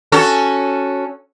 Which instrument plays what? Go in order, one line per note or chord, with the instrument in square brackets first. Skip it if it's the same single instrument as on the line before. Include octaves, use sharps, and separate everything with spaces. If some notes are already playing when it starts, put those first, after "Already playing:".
[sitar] C#4 F#4 A4